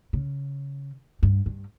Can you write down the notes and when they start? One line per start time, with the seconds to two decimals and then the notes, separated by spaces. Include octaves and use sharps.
0.13 C#3
1.23 G2
1.46 G2